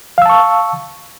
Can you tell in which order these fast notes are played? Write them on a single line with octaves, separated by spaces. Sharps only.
F5 E6 A5 C#6